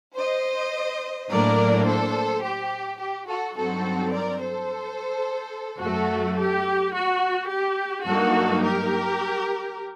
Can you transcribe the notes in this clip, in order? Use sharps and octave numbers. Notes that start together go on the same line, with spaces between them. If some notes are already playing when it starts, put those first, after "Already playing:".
C5 D#5
A2 F#3 A#3 D4 A#4 D5
A4 C5
G4
G4
F#4 A4
G2 F#3 C4 D#4 F#4 A4
A#4 D5
A4 C5
F#2 F#3 A3 F#4 A4
G4
F#4
G4
G2 F#3 A#3 D#4 F#4 A4
G4 A#4